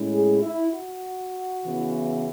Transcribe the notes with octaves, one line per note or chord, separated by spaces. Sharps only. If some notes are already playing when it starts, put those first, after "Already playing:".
Already playing: A2 G#3 C#4 E4
G#4
E4
F#4
C#3 E3 B3 E4